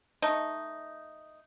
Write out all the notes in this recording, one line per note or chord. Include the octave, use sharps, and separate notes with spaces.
A3 D#4